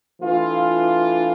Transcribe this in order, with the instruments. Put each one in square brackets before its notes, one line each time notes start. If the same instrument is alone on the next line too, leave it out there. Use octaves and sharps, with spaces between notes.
[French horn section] E3 A3 D4 F4